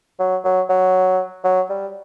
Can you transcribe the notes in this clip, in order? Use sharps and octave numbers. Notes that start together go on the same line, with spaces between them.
F#3
F#3
F#3
F#3
G3